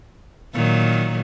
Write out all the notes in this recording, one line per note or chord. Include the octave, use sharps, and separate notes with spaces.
A#2 D#3 F#3